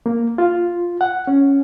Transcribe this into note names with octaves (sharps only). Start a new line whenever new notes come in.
A#3
F4
F#5
C#4